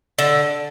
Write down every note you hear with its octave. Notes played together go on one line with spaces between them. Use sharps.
D3